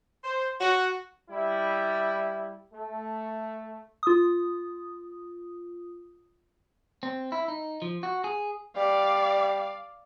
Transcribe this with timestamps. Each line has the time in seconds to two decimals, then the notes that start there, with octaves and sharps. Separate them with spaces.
0.23 C5
0.60 F#4
1.28 G3 E4
2.73 A3
4.03 F4 D#6
7.03 C4
7.32 E4
7.48 D#4
7.82 F3
8.03 F#4
8.24 G#4
8.77 G3 D5 F5